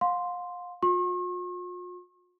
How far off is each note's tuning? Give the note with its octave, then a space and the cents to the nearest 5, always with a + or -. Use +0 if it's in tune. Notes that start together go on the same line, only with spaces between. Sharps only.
F5 +35 C6 +0
F4 +45 C#6 -45